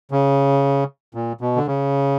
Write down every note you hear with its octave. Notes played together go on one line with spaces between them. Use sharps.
C#3
A#2
B2
D3
C#3